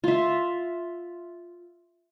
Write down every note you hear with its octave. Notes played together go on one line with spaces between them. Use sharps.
F4 E5